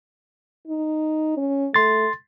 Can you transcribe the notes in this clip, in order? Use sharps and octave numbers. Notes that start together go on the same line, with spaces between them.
D#4
C#4
A3 C6 A6